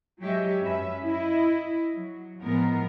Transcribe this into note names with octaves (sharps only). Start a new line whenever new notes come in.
F#3 G#3 G4 C#5 D#5 E5
F#2 C#4 B4 E5
E4 D#5
F#3
A2 F3 G#3 B3 A#4